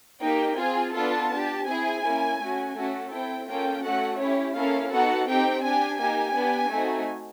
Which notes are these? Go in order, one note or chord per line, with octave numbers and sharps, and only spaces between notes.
A#3 D#4 G4 G5
C4 F4 G#4 G#5
B3 D4 F4 A4 A5
D4 G4
C4 E4 G#4 G#5
A#3 C#4 E4
A3 C#4 F#4
A3 C#4 F#4 A4
C4 E4 A4 G5
A#3 C#4 F4 A4 G5
A3 C#4 F#4 A4 F#5
C#4 E4 G4 C#5
A#3 C#4 E4 A4 F5
B3 D#4 F#4 A4 F#5
C4 D#4 G4 G5
D4 G#5
G4
A#3 D#4 G4 G#5
B3 D4 G4
A3 C4 D#4 F#4